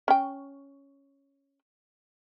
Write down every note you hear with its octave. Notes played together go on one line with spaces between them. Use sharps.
C#4 G5